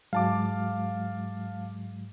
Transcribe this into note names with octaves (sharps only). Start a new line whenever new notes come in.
G#2 F#3 G#3 F5 A5 D6